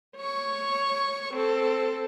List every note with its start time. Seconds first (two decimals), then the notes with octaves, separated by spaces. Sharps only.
0.17 C#5 C#6
1.34 C4 A4